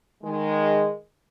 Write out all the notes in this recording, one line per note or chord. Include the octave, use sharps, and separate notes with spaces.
D#3 G#3